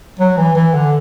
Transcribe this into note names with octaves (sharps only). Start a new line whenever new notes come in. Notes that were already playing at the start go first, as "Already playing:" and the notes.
F#3
E3
E3
D3